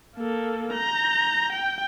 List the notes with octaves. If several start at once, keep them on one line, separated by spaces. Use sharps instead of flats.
A#3 A4
A#5 G6
G5